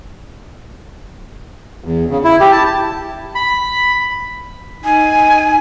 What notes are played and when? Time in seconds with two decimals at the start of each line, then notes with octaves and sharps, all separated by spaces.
1.84 E2
2.10 C#3
2.24 E4
2.40 G4
2.52 A5
3.35 B5
4.84 D#4 G#5